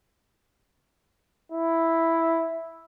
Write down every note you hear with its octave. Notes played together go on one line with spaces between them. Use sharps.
E4